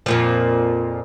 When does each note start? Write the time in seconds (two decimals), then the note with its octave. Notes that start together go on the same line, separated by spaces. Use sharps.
0.06 F2 A#2 F3